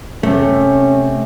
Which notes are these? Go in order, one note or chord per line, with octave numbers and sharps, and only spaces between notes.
C3 A3 C#4